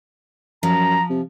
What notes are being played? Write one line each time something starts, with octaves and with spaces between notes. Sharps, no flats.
F#2 F3 A#5
C3